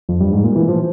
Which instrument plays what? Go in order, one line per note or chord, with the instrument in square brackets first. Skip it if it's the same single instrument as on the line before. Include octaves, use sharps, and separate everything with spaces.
[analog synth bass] F2
G2
G#2
A#2
E3
F3